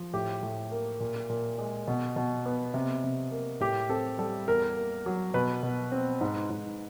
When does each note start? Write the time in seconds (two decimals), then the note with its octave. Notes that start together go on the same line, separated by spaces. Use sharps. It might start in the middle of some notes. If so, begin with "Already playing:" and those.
Already playing: F3
0.14 A2 G4
0.43 A2
0.71 A#3
1.00 A#2
1.29 A#2
1.58 G#3
1.87 B2
2.16 B2
2.46 B3
2.74 C3
3.04 C3
3.31 A#3
3.60 A2 G4
3.89 C4 A4
4.19 G3 A4
4.47 E2 A#4
4.77 A#3
5.06 F#3
5.34 B2 B4
5.63 B2
5.92 C4
6.21 G#2
6.50 G#2